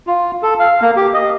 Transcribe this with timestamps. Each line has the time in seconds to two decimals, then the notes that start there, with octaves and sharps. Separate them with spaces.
0.07 F4
0.43 A4
0.59 F5
0.82 A#3
0.96 G4
1.14 D#5